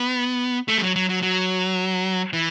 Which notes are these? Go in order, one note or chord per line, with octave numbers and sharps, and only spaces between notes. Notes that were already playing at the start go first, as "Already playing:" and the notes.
Already playing: B3
A3
G3
F#3
F#3
F#3
F#3
E3